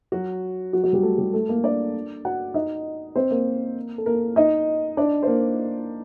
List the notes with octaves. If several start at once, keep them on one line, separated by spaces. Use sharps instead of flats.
F#3 F#4
F#3 F#4
F#3 F#4
G3 G4
A3 A4
G3 G4
A3 A4
A#3 A#4
D4 D5
F#4 F#5
D#4 D#5
C4 C5
A#3 A#4
A4
A#3 A#4
D#4 D#5
D4 D5
C5
A#3 A#4